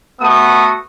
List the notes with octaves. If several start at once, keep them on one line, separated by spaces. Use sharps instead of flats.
A3 B3 F#4 D#6